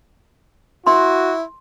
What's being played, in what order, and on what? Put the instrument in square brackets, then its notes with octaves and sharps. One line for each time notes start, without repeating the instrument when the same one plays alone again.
[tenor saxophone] E4 [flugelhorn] F#4 [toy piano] C6